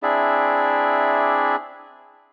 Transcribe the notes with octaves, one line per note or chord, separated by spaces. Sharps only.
C4 D4 E4 G#4 D5 E5